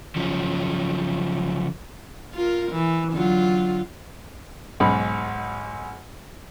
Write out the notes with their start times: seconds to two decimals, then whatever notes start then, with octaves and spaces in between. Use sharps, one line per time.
0.16 C#3 F3 F#3
2.34 F4 A#4
2.72 E3
3.13 D3 F#3 F4
4.80 B1 G#2 B5